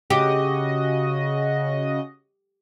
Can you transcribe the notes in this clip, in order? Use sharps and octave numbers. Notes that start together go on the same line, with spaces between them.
C#3 F#4 G4 D#5